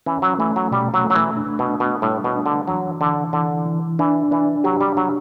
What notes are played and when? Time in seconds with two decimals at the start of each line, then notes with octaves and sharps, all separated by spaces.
0.06 E3 C#4
0.22 F#3
0.39 E3 A3
0.56 F#3
0.71 B2 G3
0.94 F#3
1.04 A3
1.10 F#3
1.15 E3
1.37 D4
1.59 B2
1.69 D4
1.80 B2
2.02 A2 G3
2.24 B2
2.36 D4
2.46 D3
2.68 E3 F#3
3.00 D3 E3
3.33 D3 E3
3.66 E3
3.99 E3 D4
4.31 E3 D4
4.64 F#3 G4
4.81 G3
4.96 F#3 D4